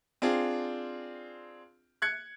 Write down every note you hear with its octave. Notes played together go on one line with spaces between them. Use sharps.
C4 D4 F4 G#4
F#6 G#6 C#7